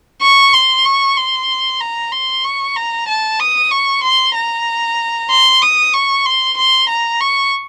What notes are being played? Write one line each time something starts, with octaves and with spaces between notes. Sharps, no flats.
C#6
C6
C#6
C6
A#5
C6
C#6
A#5
A5
D#6
C#6
C6
A#5
C6
D#6
C#6
C6
C6
A#5
C#6